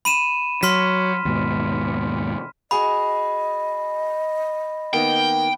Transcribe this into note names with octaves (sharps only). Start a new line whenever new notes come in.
B5 D#7 E7
F#3 C6 F6 B6
D#2 G#2 B2
F#4 G#4 D#5 G#5 B5
D#3 A#3 B3 G5